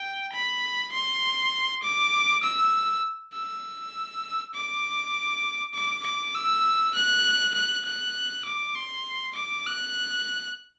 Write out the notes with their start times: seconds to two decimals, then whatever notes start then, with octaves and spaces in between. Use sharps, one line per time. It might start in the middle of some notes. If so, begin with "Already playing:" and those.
Already playing: G5
0.33 B5
0.92 C6
1.83 D6
2.43 E6
3.33 E6
4.54 D6
5.74 D6
6.04 D6
6.34 E6
6.95 F#6
7.55 F#6
7.85 F#6
8.45 D6
8.75 C6
9.35 D6
9.66 F#6